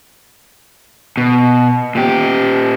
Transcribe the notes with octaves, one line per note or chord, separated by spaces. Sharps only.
B2
A#2 G4